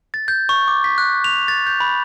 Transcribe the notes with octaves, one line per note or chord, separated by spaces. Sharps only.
A6
G6
C#6
D6
B6
F#6
F7
A6
G6
B5